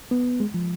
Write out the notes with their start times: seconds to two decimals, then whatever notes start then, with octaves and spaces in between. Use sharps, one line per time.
0.11 B3
0.40 G#3
0.54 F3